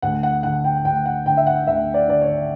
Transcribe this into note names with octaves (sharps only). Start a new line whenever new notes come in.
D2 F#5
F#5
D3 F#5
G5
D2 G5
F#5
D3 G5
E5
F#5
D2 E5
D5
D3 D5
C#5